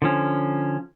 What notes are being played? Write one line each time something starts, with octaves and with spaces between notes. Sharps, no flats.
D3 F3 C#4